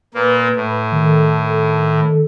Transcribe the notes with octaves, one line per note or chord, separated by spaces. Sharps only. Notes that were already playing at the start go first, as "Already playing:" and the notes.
A#2 A#3 B4
A2
D#3 A4